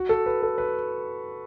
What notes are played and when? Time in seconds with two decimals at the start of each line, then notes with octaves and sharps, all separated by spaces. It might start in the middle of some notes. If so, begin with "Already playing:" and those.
Already playing: F#4
0.09 A4
0.26 B4
0.42 A4
0.58 B4